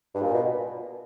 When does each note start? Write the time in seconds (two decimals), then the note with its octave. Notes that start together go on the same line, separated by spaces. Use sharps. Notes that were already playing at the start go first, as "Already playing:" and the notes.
0.14 G2
0.22 A#2
0.34 B2